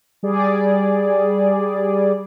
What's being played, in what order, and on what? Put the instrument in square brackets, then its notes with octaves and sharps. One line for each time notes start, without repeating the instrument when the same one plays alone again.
[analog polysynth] G3 G#4 D5